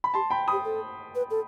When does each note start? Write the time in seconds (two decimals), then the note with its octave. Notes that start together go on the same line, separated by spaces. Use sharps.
0.04 B5
0.14 G4 A5 C6
0.30 G5 B5
0.48 G4 B5 D#6
0.65 A4
1.15 B4
1.31 A4